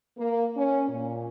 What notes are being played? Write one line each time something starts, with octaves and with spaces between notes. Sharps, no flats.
A#3
C#4
A#2